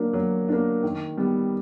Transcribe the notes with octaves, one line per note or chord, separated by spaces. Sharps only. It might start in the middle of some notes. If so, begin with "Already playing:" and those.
Already playing: F#3 A#3 D4
F#3
A#3 D4
D#3
G3 B3